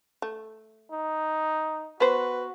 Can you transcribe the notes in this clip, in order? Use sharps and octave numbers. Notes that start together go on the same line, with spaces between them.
A3
D#4
B3 F#4 B4 C5